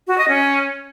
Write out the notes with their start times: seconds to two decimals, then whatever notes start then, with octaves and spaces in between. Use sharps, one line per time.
0.07 F#4
0.18 D#5
0.28 C#4